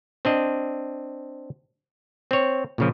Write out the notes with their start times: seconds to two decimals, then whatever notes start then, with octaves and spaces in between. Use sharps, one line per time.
0.25 C4 D4 D#5
2.31 C4 C#5
2.78 A#2 C#3 F3